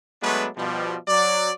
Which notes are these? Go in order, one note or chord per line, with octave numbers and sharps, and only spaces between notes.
F#3 G#3 A3 B3 D4 B4
B2 F3 G3
F#3 D5